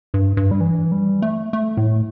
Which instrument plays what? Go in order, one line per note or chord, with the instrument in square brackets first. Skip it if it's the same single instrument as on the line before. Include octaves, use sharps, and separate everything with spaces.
[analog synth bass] G2
G2
G3
E3
G3
A3
A3
A2